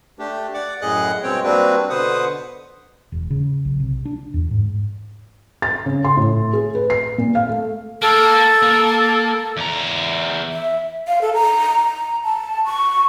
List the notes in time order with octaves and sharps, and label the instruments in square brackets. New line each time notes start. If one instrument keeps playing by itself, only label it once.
[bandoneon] A3 D4 G4
D5 F#5 D6
F#2 A2 G#4 D#5 F#5 F#6
G2 B2 G#3 C4 C#5 G5
G3 A#3 C4 D4 F#4 B4
B2 D3 B4 C5 F#5 D#6
[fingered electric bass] E1
C#3
B1
C3
D4
E2
G#2
[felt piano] A6
C#3
C6
A2
G#4
B4
C7
A#2
F5
A3
[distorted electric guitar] A#3 [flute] A4
[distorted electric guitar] A#3
E2 A#5
[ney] E5
F5
A4
A#5
A#5
A5
C#6